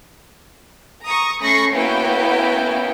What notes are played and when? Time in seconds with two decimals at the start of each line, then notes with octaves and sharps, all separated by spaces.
1.04 A#5 C#6 D#6
1.41 A3 C#4 B5 C#6 A#6 C7
1.73 A#3 B3 C#4 E4 F#4 G5